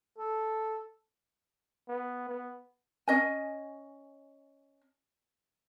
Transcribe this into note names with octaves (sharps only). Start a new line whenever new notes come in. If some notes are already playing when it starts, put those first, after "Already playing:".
A4
B3
B3
C#4 D#5 G#5